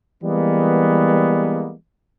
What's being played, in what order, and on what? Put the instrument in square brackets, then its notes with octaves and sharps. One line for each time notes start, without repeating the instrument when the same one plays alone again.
[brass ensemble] E3 G3 G#3 A#3 B3